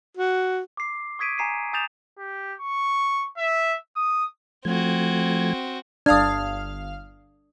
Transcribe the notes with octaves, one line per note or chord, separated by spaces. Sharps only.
F#4
D6 C7
C#6 D#6 G#6 B6 D7 D#7
G#5 A#5 C7 D#7
G#5 D#6 G6 A6 E7 F7
G4
C#6
E5
D#6
F3 A3 C4 F#4 G#6
G1 D4 F5 D#6 F6 G#6